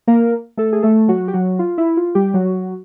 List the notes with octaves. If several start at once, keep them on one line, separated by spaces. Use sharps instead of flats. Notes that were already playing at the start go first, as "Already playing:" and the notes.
A#3 A#4
A3 A4
G#4
A3 A4
F#3 F#4
G4
F#3 F#4
F4
E4
F4
G3 G4
F#3 F#4